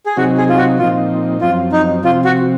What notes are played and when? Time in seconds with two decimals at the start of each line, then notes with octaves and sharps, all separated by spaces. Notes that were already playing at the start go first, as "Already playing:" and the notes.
0.06 G#4
0.17 C3 F#3 C4 D#4 F#4
0.37 G#4
0.49 F4
0.58 F#4
0.79 A#2 F3 C4 D#4 F4
1.41 F#2 F3 C4 F4
1.72 D#4
2.04 C3 F3 C4 F4
2.25 F#4